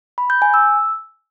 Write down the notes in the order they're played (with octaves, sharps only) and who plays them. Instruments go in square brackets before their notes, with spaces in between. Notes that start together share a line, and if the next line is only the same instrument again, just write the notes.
[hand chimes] B5
G6
G#5
E6